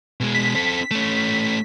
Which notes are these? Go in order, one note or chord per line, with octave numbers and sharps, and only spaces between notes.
B2 G#3
B6
C4 A4
A3 C#4